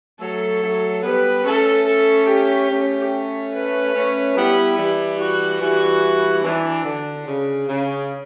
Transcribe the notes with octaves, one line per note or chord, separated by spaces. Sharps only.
F#3 A3 A4
F#3 A3
G3 B3 B4
A3 C#4 A4
A4
G4
A3 C#4
B4
A3 C#4
G3 B3 E4
E3 G3
F#4
E3 G3 F#4
E3 D4
D3
C#3
C#3